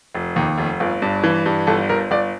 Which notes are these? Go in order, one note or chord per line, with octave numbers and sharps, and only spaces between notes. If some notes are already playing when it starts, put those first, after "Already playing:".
F1
D#2
F1
G1
G2
E3
G2
G1 A4
G1 A#4
G1 D5